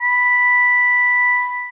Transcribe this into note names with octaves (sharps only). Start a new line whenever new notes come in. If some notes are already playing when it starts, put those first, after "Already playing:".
B5